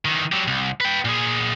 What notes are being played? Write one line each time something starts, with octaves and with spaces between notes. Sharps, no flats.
D#3 E3
F#3 G4
C2
B4 G5
A#2 G#4